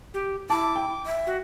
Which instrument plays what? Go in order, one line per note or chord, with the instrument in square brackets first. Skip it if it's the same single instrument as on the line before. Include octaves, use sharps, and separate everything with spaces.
[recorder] G4
[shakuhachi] E4 [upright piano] A5 [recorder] D6
[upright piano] G5
[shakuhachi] E5
[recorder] F#4